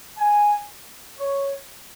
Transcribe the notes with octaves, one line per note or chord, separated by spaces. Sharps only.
G#5
C#5